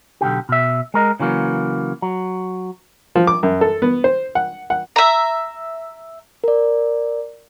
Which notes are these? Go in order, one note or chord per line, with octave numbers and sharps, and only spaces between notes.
B1 F2 D3 G4
B2 E5
G#3 A#4 D#5
C#3 E3 F#3 A#3
F#3
F3
D6
F#2
A4
B3
C5
F#5
F#5
E5 A#5
A#4 D5